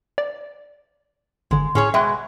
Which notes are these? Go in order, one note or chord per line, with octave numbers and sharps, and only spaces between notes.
D5
G#1 D3 G#3
A2 C#4 G#4 C#5
B2 G#3 E5 G5 F#6